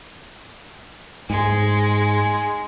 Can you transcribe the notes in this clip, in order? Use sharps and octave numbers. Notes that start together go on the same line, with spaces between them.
G#2 G#3